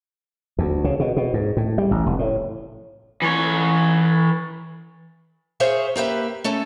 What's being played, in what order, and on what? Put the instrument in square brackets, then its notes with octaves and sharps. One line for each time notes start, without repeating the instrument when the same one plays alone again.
[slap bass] D2
C#3
B2
B2
G#2
A2
G3
A1
F1
A2
[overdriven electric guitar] E3 C#5
[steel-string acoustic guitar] G#4 C5 C#5 E5 F5
A#3 G4 B4 E5
A3 C#4 A4